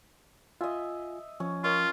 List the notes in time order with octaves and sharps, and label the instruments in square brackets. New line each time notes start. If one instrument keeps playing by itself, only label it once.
[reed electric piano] F4 G#5 [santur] D#5 E5
[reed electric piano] F3 [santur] C#4
[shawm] F4 [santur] A#4 C#5 D#5